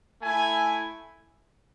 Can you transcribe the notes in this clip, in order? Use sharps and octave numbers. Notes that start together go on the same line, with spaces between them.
A3 E4 G#5